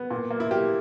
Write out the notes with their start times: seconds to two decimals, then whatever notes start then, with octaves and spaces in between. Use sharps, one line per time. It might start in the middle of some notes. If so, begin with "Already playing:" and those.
Already playing: B3
0.11 A#2
0.30 A#3
0.40 E4
0.51 A#3 G4